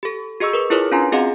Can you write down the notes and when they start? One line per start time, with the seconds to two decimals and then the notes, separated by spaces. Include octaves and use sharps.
0.03 G4 A4
0.40 F#4 G#4 D#5 C#6 E6
0.53 A#4 B4
0.70 E4 F4 G#4 A#4 B4 C#5
0.92 C#4 D4 F4 G#5 A#5 C6
1.12 C4 F#4 G#4 D#5 F5 F#5